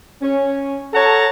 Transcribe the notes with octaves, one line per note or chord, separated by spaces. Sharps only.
C#4
A4 C#5 F#5 A5 A#5